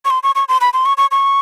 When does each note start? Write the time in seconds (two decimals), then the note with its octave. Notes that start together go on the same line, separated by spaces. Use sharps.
0.05 C#6
0.10 C6
0.23 C#6
0.35 C#6
0.48 C6
0.61 B5
0.73 C6
0.86 C#6
0.98 C#6
1.11 C#6